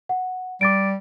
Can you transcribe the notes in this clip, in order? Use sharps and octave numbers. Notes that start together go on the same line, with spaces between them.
F#5
G3 D6 A6 D7